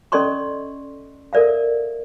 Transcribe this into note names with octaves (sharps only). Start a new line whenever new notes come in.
C#4 A4 D5 D#5 C6 C#6
A4 A#4 D5 E5 F5